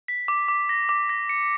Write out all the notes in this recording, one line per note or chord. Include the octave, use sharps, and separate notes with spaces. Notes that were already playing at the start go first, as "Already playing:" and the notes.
B6
D6
D6
A#6
D6
A#6
C#7